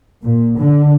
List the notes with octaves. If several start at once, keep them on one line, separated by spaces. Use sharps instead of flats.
A#2
D3